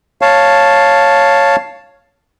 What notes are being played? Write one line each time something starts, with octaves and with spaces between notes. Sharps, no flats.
C#5 F5 A5